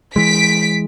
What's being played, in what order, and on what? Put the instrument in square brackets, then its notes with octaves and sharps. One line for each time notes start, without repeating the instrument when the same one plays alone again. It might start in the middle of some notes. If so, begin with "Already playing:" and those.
[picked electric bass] E3 G#3 [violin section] B6 D7